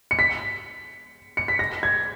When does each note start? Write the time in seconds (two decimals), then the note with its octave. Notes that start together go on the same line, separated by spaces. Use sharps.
0.11 C#7
0.19 B6
1.37 C#7
1.48 B6
1.59 A#6
1.83 G#6